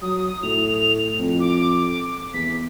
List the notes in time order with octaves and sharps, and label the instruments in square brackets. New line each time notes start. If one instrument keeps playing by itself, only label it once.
[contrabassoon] F#3 [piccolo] D#6
[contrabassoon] A2 [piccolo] F7
[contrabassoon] F2
[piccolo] D6
[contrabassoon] E2 [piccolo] B6